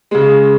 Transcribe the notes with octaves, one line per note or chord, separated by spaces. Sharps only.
C#3 G#3